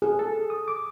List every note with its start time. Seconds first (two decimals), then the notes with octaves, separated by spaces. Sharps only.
0.02 G#4
0.19 A4
0.50 D#6
0.68 D6